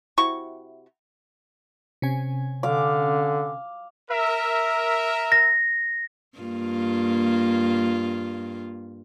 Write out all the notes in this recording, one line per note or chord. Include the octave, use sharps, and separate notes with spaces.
C3 E4 F#4 C#6
C3 C#4 G#5
D3 F5 D6
A#4 E5
A#6
G2 A#3 F4